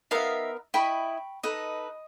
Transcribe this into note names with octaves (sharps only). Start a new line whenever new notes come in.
B3 D#4 A#4 E5 F5
E4 D#5 G5 B5 C#6
D#4 A4 B4 D#5